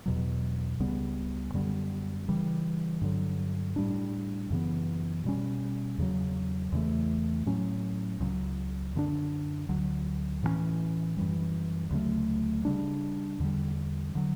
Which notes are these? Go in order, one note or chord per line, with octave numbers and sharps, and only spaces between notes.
E2 B2 F#3
C#2 C#3 G3 B3
F#2 D3 G3 B3
C#3 E3 G3
G2 D3 F#3
A2 G3 D4
F#2 C#3 E3 B3
B2 G3 C#4
E2 C#3 F#3
E2 C#3 E3 A3
A2 F#3 C#4
C#2 C#3 F#3
F#2 D3 A3 D4
D2 D3 F#3
A2 E3 G3 C#4
F#2 E3 G3
D2 C#3 F#3 A3
C#3 G3 D4
E2 D3 G3
D3 F#3